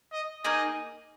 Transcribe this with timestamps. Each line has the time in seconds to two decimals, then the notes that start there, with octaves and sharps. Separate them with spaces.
0.13 D#5
0.44 A#3 D#4 G#4 D#5